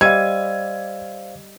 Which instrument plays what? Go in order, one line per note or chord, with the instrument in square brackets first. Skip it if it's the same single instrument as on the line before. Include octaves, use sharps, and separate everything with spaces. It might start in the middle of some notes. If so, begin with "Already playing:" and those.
[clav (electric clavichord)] G3 [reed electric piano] C5 D5 F5 [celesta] D#5 E6 D#7 [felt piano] G#6